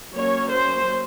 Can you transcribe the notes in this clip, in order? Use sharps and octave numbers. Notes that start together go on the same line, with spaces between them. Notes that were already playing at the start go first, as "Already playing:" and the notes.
F#3 A#3 C#4 C#5
C5